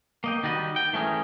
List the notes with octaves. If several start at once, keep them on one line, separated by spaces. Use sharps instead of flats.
A#3 D#5 G5
D#3 G3 F#4 D#5
G5
E3 A3 C#4 G#4 A#4